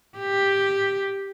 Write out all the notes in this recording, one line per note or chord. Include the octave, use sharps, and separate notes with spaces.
G4